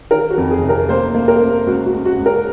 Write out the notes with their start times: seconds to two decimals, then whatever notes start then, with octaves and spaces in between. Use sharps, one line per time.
0.11 D#3 A#4
0.30 F#4
0.38 F2
0.50 G#4
0.63 C3
0.69 A#4
0.89 A#3 C5
1.15 A#3
1.28 A#4
1.41 A#3
1.67 C#2 F#4
1.86 F#4
1.93 C#2
2.05 F#4
2.19 C#2
2.26 A#4